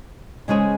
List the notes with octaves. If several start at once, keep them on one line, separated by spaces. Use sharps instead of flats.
C#3 G#3 C#4 G#4 C5